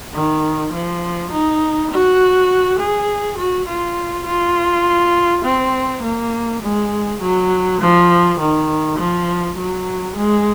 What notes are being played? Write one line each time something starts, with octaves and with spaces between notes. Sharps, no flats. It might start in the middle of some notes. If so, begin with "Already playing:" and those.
D#3
F3
D#4
F#4
G#4
F#4
F4
F4
C4
A#3
G#3
F#3
F3
D#3
F3
F#3
G#3